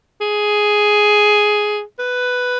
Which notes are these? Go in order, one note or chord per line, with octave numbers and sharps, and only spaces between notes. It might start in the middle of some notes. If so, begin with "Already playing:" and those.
G#4
B4